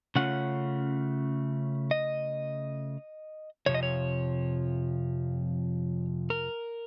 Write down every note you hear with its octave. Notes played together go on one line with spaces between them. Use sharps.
C#3 A3 C#4 F4 F#5
D#5
F2 C3 F3 C#5
D#5
C#5
A#4